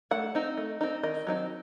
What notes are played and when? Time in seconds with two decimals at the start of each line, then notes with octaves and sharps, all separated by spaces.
0.11 A3 F#5
0.35 C4 D#4
0.57 A3
0.81 C4 D#4
1.03 D#3 D#5
1.27 F#3 C4 D#4